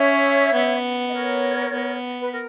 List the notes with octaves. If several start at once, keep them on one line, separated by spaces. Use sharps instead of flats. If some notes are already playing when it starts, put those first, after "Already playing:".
Already playing: C#4 C#5 E5
B3
D#5
A#4 C#5
B3
B4
A#4